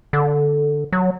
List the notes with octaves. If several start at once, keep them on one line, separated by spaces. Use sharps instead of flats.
D3
F#3